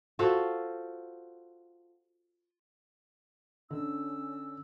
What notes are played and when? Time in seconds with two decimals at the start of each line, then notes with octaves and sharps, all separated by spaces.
0.19 F4 F#4 A4 C5
3.71 D3 C#4 E6